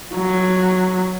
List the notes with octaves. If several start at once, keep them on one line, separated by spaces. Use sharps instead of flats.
F#3